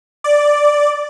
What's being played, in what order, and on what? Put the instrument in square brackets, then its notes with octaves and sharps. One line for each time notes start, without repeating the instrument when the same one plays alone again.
[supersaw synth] D5